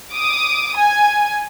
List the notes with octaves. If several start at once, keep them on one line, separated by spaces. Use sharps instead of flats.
D6 D#6
G#5